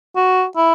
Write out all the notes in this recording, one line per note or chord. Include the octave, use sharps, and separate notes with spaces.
F#4
E4